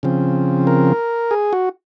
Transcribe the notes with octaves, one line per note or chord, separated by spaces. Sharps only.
C#3 F3 C4
A#4
G#4
F#4